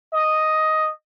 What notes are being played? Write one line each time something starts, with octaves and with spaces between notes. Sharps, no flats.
D#5